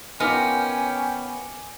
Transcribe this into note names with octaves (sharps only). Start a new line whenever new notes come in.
B3 C#4 D#4 F4 A#4 G5 G#5 D6